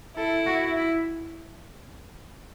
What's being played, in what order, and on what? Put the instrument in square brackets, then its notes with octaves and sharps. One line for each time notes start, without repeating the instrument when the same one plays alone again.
[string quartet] E4 [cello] A4
[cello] F#4
E4